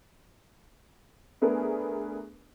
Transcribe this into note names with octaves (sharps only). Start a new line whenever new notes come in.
A3 B3 D4 G#4 A#4 B4